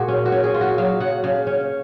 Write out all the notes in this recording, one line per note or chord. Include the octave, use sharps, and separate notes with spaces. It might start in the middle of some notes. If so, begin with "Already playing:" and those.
Already playing: A#2 G#3 F#4 G#4
C#4
F#4
C#4
G#4
F4
F#4
F#3 F5
C#3 F#5
C#3 F5
C#4 C#5